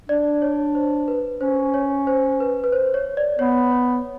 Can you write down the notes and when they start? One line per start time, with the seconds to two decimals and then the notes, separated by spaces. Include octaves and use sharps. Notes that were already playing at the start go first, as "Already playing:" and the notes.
0.09 D4 D5
0.42 C#5
0.75 C5
1.08 B4
1.41 C#4 C5
1.74 C#5
2.07 C5
2.40 B4
2.64 B4
2.72 C5
2.94 C#5
3.17 D5
3.39 B3 C#5
3.71 C#5